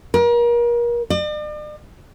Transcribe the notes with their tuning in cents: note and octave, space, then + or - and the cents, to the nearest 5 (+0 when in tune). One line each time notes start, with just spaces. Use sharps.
A#4 +35
D5 +45